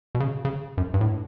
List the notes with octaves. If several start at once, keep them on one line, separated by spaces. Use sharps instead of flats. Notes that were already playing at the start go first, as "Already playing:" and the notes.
B2
C#3
C#3
F#2
G2
A2